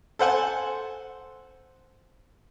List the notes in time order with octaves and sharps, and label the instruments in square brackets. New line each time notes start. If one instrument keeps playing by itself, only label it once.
[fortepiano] A4 C5 F#5 G#5